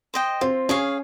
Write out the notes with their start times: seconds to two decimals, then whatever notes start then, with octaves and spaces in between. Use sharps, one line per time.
0.14 C5 D#5 G5
0.41 C4 F4
0.69 C#4 G#4 C#5 F5